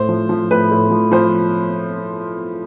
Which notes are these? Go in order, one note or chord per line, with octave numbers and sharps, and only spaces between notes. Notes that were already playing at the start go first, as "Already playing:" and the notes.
Already playing: A2 C5
F3
F3
A2 B4
A2
F3
F3 C5